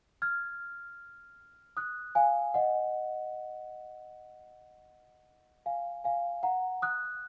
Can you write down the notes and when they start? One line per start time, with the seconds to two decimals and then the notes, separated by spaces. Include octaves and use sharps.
0.22 F6 G#6
1.77 D#6 F#6
2.15 F5 G#5
2.54 D#5 F#5
5.66 F5 G#5
6.04 F5 G#5
6.43 F#5 A#5
6.82 D#6 F#6